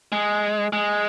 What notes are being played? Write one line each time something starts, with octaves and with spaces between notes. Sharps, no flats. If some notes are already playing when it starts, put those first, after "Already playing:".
G#3
G#3